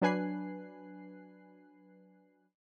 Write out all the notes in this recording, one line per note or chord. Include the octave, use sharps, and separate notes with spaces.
F#3 D4 B4 G#5 F#6 C7